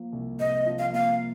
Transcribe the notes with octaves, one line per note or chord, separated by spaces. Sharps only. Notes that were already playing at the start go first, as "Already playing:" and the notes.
Already playing: F3 A#3
C2
C3 D#5
F3
F5
A#3 F5